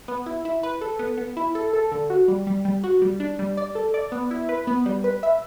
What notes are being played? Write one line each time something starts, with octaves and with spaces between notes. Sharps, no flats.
B3
E4
E4
B4
A4
B3
B3
E4
A4
A4
D3
F#4
G3
G3
G3
F#4
G3
D4
G3
D5
A4
D5
B3
E4
B4
B3
G3
B4
E5